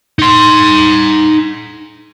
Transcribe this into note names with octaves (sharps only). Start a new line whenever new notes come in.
D#4 C6